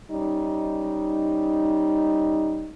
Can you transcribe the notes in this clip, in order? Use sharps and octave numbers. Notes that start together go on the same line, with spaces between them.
G3 C#4 D#4